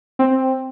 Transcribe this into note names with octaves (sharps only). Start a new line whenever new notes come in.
C4